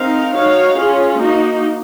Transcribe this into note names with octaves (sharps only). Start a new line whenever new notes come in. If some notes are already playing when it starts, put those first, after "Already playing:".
Already playing: C4 D#4 A#4 F5
D#4 F#4 C#5 F5
C#4 F4 G#4
A#3 D#4 F#4